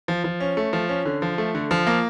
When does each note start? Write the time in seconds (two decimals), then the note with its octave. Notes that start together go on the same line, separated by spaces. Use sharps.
0.08 F3
0.24 F3
0.40 C#4
0.57 A3
0.73 F3
0.89 C#4
1.05 D3
1.22 F3
1.38 A3
1.55 D3
1.71 F3
1.87 A#3